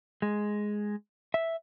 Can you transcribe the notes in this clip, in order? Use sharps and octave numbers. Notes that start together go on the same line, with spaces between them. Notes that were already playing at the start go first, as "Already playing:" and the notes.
G#3
E5